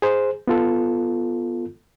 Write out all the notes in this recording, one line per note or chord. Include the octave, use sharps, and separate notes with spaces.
G#4 C5
B3 F4 A4